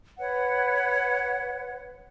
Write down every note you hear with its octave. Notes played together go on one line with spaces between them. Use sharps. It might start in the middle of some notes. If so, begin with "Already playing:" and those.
B4 C#5 F#5